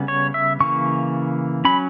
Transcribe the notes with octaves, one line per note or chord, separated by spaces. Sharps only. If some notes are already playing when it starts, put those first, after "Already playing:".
Already playing: C#3 G3 B3
C#5
E5
C#3 E3 A#3 C#6
F#3 C#4 B5